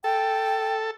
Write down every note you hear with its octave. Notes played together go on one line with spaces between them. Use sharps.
A4 G5